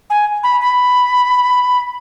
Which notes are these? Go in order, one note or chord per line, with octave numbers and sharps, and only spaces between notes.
G#5
B5
B5